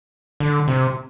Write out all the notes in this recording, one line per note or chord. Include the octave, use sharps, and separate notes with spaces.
D3
C3